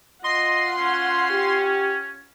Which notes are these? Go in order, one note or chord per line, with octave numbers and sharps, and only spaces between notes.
F4 D#5 F#5 C6
C#4
G4